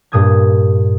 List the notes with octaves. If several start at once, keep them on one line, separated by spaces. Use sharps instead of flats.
G2 A#2 D#6 G6 G#6